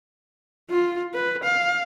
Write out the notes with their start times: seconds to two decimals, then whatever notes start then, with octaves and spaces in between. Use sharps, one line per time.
0.70 F4
1.14 B4
1.44 F5